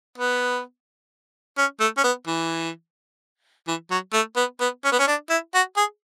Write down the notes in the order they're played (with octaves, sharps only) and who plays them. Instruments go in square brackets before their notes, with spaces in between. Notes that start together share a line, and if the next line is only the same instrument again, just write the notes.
[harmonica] B3
C#4
A3
C#4
B3
E3
E3
F#3
A3
B3
B3
C#4
B3
C#4
D4
E4
F#4
G#4